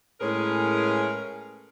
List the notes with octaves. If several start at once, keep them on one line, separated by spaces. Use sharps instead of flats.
A2 G#3 C#4 G#4 A#4 B4